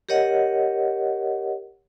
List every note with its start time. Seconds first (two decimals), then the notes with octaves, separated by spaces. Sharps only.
0.09 G4 A#4 C#5 D#5 F#5